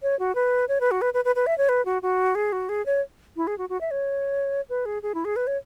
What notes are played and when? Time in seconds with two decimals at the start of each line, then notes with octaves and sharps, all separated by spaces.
0.02 C#5
0.19 F#4
0.35 B4
0.69 C#5
0.81 B4
0.91 F#4
1.02 B4
1.14 B4
1.25 B4
1.36 B4
1.47 E5
1.58 C#5
1.69 B4
1.85 F#4
2.02 F#4
2.35 G#4
2.52 F#4
2.69 G#4
2.86 C#5
3.36 E4
3.47 G#4
3.58 F#4
3.69 F#4
3.81 E5
3.91 C#5
4.69 B4
4.86 G#4
5.03 G#4
5.15 E4
5.25 G#4
5.36 B4
5.47 C#5